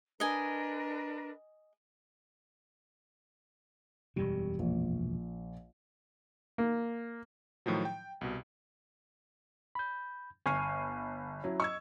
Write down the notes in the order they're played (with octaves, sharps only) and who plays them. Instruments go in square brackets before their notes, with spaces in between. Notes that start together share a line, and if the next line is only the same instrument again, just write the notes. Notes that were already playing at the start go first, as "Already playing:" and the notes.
[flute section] D4 A#4 B4 [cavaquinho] D#5 G#5
[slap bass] E1 F#2 B2 [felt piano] G3
[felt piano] A#1
[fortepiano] A#3
[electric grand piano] A2 D#3 F3 F#3
G5
C2 B2
[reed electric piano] B5 G6
[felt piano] G1 C7 D#7 [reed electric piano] G#5 C#6 F6
[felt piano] F#3 C#4 E4
[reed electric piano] D#5 [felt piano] C#6 E6 G#6